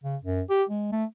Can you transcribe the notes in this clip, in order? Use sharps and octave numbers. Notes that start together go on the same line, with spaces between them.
C#3
F#2
G4
G#3
A3